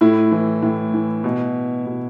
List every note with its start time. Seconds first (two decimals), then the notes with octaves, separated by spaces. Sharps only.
0.01 A2 E4
0.32 E3
0.62 A2
0.94 E3
1.24 B2
1.86 B2